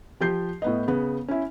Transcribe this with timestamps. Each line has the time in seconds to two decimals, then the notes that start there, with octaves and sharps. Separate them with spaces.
0.21 F3 G4 G6 C7
0.62 A2 B3 D#5
0.88 C#3 B3
1.28 C#4 E4